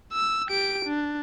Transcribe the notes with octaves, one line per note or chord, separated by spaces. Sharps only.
E6
G4 D7
D4